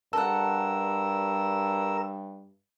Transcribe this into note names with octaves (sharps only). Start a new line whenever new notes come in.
G2 A4 A#4 F#5 E6